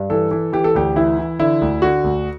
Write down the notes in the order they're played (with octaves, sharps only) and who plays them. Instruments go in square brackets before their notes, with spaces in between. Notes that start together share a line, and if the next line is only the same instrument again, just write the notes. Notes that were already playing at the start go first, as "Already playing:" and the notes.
Already playing: [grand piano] G2
E3 A4
E3
E3 G4
A4
D2 G4
E3 E4
E3
D3 E4
D2
D3 F#4
D2